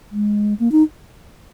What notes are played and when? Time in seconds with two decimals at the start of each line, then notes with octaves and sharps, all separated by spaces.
0.11 G#3
0.60 A#3
0.72 D#4